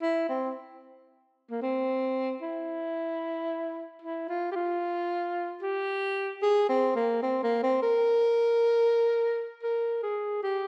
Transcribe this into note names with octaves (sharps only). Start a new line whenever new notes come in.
E4
C4
A#3
C4
E4
E4
F4
G4
F4
G4
G#4
C4
A#3
C4
A#3
C4
A#4
A#4
G#4
G4